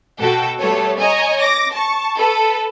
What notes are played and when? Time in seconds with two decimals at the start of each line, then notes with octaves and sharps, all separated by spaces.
0.20 B2 F#4 A4 G5
0.59 G3 A3 B3 A4 C#5
0.98 C#5 D#5 G#5 A#5
1.39 D6 A#6
1.73 A5 C#6
2.18 A4 B4